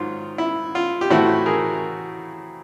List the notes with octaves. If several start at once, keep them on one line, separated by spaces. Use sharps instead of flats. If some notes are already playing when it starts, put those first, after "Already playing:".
Already playing: G#2 D#3 F#3 F4
E4
F4
G4
A2 E3 A3 C4 E4 F#4
G#4 A#4